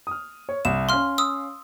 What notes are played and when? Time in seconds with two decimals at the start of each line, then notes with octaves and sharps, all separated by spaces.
0.07 D#6 F6
0.49 C#5
0.65 C2 E7
0.89 C#4 F5 C6 F6
1.18 D#6 E6